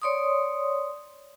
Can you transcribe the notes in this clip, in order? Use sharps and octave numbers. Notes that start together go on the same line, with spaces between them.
C#5 D5 C6 C#6 D#6